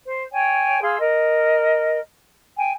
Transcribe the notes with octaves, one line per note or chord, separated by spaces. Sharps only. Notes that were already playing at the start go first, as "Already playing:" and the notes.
C5
C#5 G5 G#5
G#4 F5 C6 E6
A#4 D#5
G5 G#5